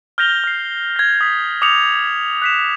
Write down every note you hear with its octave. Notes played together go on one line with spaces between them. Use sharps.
F6 G6 A#6 F7 G7
F6 C7
G#6 A#6
D#6 B6
D6 D#6 G6 C#7 F7
F#6 B6 E7